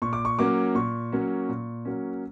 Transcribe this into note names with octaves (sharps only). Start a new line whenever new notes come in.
A#2 C#6
D6
C#6
F#3 A#3 C#4 D6
A#2 C#6
F#3 A#3 C#4
A#2
F#3 A#3 C#4